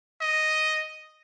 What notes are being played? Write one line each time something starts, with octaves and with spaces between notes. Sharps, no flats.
D#5